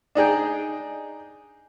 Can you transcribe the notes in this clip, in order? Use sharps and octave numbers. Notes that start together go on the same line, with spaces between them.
D4 D#4 G#4 G5